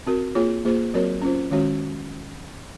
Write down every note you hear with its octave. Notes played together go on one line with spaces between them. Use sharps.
C4 F#4 A#4
A#3 F4 G#4 C#5
A#3 F4 G#4 C5
F#3 C4 F#4 A#4 C#5
C#4 F4 C5
D#3 G#3 C#4 F#4 C#5